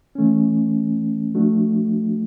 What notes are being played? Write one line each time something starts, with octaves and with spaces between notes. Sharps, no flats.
E3 A3 C#4
F3 A3 D4 F#4